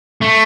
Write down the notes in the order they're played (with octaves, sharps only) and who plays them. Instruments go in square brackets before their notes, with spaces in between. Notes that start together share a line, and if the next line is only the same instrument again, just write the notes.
[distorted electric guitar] A3